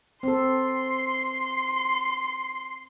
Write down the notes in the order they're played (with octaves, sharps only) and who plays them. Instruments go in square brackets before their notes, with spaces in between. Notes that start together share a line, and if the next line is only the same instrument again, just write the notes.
[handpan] C4 A4 [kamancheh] C6